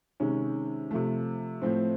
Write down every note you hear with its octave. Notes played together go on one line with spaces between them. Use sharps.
C3 D#3 G#3 C#4
C3 F3 A3
A2 F3 A3 C4